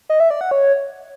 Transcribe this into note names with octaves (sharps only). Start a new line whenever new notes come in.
D#5
E5
D5
F#5
C#5